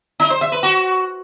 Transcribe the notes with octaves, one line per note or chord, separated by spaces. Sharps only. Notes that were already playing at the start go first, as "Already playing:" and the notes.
D#4
C5
E5
B4
F#4